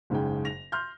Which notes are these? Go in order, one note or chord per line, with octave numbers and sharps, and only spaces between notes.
F#1 G#2 C#3 G#4 G5
A#6 F7
C6 F6 G6